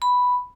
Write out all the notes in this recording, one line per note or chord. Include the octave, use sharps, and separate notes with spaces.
B5